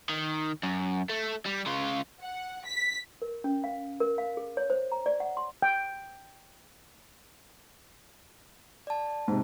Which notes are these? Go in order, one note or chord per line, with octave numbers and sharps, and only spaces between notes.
D#3
F#2
A3
G3
C#3 F4
F#5
B6
A#4
C#4
F5
A#4
F5
G#4
C#5
C5
A#5
D5
F#5
C6
G5
D5 A5
A5
G#2 C3